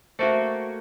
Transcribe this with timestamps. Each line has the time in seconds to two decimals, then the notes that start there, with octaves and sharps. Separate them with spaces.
0.19 A3 A#3 F#4 C5 E5